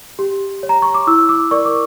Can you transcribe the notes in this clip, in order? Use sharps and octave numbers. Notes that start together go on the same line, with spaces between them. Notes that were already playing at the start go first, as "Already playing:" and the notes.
G4
C#5
A#5
C#6
D6
E4 E6
D6
A#4 D5 C#6
D6